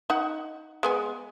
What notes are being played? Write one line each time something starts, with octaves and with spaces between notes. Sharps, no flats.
D#4 F#5
G#3 B3 G#5